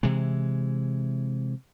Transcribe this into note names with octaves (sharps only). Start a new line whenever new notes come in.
C3 E3 G#3